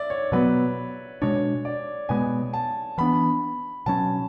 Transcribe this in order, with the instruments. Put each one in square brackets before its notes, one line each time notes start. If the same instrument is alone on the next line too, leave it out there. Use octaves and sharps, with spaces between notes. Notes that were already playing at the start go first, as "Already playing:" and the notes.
Already playing: [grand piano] D5 E5
C#5
[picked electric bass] B2 F#3 B3 [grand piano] B4
[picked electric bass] B2 G#3 D4 [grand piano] C#5
[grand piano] D5
[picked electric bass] B2 G#3 B3 [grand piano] G#5
[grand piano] A5
[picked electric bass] E3 B3 D4 [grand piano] B5
[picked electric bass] B2 F#3 C#4 [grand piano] A5